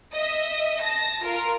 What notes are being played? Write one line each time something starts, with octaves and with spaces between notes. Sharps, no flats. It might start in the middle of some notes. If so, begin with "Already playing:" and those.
D#5 E5
A5 A#6
F4 A#4